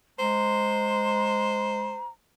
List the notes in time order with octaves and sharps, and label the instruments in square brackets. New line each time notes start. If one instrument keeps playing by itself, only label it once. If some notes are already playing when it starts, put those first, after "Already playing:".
[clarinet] G#3 [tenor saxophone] C5 [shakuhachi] A#5